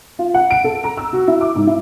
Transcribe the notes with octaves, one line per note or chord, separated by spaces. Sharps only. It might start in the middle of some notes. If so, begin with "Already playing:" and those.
F4
F#5
D7
A4
A#5
E6
F#4
E4
D6
G#2
E4